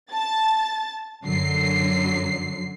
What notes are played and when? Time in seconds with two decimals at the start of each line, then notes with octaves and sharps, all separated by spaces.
0.11 A5 A6
1.24 F#2 D3 F#3 C7